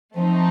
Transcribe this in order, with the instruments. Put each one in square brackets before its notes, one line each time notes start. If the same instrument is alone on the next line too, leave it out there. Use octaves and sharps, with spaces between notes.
[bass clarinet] F3 [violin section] A3 C4 D#4